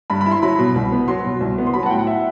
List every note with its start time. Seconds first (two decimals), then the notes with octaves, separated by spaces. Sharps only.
0.10 G2 B5
0.21 B5
0.26 E4
0.31 C6
0.43 F#3 B5
0.59 B2
0.76 C2
0.92 B3
1.08 F#3 C6
1.25 B2
1.41 C2
1.58 B3
1.66 C6
1.74 F#3 B5
1.83 A5
1.86 F#5
1.90 A2 G5
1.99 F#5
2.07 E5